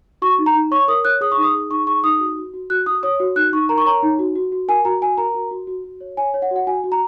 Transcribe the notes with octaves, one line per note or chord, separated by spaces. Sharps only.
F#4 C#6
D#4
A#5
D#4
C#5 C#6
A#4 D#6
C#5 F#6
G#4 D#6
C#6
D#4
D#6
G#4
D#4 C#6
G#4 C#6
D#4 D#6
F#4
F#4
F#4
F#4 F#6
F#4 D#6
C#5 D#6
F#4
D#4 F#6
D#4 C#6
A#4 A#5
C#6
C#5 A#5
D#4
F#4
F#4
F#4
A#4 G#5
F#4 A#5
F#4 G#5
A#4 A#5
F#4
F#4
F#4
F#4
C#5
C#5 G#5
C#5
F#5
F#4
F#5
F#4 G#5
F#4
A#5